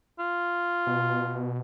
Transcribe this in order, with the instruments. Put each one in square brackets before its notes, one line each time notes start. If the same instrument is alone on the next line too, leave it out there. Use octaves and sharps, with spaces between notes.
[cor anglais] F4
[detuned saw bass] B2